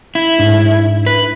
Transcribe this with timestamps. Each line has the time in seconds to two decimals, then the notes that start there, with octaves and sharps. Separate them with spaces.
0.15 E4
0.39 G#2 D4
1.06 B4